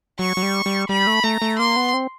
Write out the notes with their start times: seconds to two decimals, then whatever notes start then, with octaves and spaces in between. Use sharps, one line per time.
0.19 F#3 C#6
0.37 F#3
0.43 G3
0.66 G3
0.89 G3 B5
1.07 A3
1.24 A3 A#5
1.42 A3
1.59 A#3 C6
1.76 B3
1.94 C4